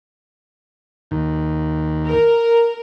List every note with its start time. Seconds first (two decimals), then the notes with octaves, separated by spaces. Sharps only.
1.11 D#2
2.07 A#4